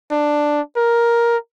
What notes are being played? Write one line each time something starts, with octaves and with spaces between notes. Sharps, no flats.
D4
A#4